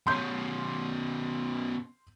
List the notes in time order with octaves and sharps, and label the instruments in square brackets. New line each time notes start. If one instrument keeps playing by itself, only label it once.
[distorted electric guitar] B2 C#4 [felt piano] C6 G6